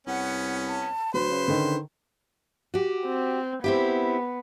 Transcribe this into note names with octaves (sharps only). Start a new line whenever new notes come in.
C2 B3 C#4 F#5
A5
D2 F#3 B4 C5
C#3
D3 D#3
F#4 G4
C4
B3 C4 E4 G4